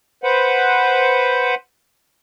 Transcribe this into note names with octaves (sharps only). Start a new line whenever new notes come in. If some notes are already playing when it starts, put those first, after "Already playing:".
B4 C5 F#5